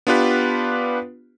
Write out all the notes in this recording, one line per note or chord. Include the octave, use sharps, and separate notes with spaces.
B3 D4 F4 G4 B4